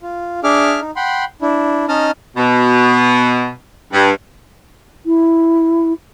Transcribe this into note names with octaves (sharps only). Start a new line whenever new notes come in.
F4
D4 G#4 E5 D6 F6
D#4
F#5 G5 B5 C6
D4 E4
C#4 D#4 D#5 A5 D#6 F6
B2
G2
E4